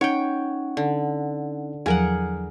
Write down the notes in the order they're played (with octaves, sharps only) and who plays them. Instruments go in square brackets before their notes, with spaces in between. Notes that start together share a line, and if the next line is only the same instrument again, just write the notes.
[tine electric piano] C#4 D#4 F#5 [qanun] C#5 G5
[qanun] D3
[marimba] E2 F3 F#3 [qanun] G#4 A#4 F#5